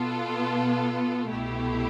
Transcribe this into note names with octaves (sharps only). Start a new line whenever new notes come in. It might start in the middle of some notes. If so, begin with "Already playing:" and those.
Already playing: B2 B3 F4 A4
C2 B2 A3 E4 G4